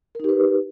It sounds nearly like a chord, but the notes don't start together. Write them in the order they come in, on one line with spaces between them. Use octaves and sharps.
A#4 D#4 G4 B4